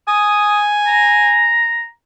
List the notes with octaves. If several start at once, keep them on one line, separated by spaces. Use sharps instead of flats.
G#5 D#6
A#5